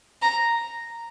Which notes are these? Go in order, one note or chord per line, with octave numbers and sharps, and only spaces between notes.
A#5